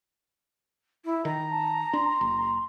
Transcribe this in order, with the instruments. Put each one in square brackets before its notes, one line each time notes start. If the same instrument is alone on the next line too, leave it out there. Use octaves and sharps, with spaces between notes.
[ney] E4
[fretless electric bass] D#3 [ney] A#5
[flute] A5
[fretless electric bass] D4 [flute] C6
[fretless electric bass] F#1